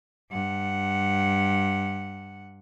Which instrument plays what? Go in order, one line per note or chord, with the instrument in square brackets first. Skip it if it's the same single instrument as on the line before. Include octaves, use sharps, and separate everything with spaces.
[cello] G2 F#5